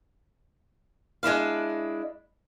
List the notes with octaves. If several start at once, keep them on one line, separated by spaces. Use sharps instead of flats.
G#3 D4 E4 F5